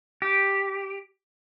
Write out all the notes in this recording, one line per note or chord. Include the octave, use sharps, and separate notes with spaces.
G4